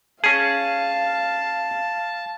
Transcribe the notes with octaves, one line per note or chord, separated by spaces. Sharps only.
C#4 G#4 F5 A5